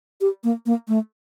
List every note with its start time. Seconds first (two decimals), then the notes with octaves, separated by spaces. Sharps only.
0.21 G4
0.44 A#3
0.66 A#3
0.88 A3